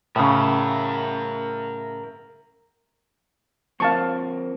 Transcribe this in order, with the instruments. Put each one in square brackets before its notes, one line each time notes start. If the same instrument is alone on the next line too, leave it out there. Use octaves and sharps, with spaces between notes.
[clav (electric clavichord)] A2 C#3 [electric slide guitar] A#4 E5
[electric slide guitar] F3 A#3 C4 [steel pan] F5 A5 C#6